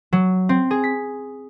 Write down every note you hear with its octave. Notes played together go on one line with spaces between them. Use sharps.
F#3
C4
G#4
B6